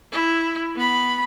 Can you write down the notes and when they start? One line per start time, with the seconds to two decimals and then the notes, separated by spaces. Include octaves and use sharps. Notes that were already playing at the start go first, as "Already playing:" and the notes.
0.12 E4
0.76 B3 B5